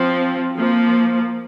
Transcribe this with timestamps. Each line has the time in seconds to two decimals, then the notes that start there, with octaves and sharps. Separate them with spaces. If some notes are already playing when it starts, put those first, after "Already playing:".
Already playing: F3 C4
0.54 F3 A#3